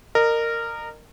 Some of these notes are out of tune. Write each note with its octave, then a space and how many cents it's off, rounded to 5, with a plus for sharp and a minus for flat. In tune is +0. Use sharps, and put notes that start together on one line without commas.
A#4 -15 D#5 -35